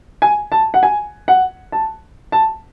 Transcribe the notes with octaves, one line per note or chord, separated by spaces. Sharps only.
G#5
A5
F#5
G#5
F#5
A5
A5